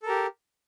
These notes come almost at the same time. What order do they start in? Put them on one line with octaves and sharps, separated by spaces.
A4 A#4 G4